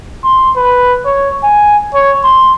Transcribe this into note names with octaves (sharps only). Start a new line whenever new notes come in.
C6
B4
C#5
G#5
C#5
C6